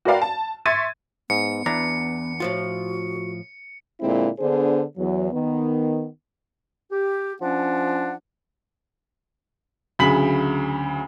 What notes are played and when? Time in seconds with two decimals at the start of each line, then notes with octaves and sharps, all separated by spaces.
0.05 F#4 A#4 B4 D5 F5 G5
0.22 A5
0.66 E5 C6 C#6 G#6 A6 D#7
1.30 G#2 B3 C#7
1.66 E2 D4 E4 A#5
2.40 A2 F3 F4 F#4
4.01 A#2 D3 G#3 C4 E4
4.38 D3 B3 D4 G#4 C5
4.97 E2 F#3
5.32 D#3 B3
6.91 G4
7.41 F3 C#4 D4 F#5
9.99 D2 C#3 F#3 B5 B6 F#7